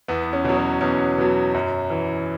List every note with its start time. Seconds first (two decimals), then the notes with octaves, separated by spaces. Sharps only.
0.08 E2 B3
0.33 C#4
0.44 B2 F#3
0.57 C#4
0.81 E2 C#4
1.18 B2 F#3
1.54 F#2
1.90 E3